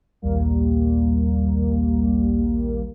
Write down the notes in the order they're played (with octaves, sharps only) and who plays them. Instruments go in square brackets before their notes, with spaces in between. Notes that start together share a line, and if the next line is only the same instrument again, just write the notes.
[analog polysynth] A#1 D#2 G3 A#3